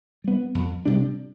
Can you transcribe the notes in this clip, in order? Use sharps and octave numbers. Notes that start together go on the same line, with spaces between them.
G3 B3
F2
C3 G3 D4